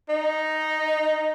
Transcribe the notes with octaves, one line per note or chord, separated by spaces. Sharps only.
D#4